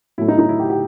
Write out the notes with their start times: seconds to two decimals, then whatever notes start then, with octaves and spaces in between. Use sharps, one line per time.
0.18 A2 F#3 A3 E4
0.28 D#4
0.39 D#4
0.49 E4
0.59 G4
0.70 G4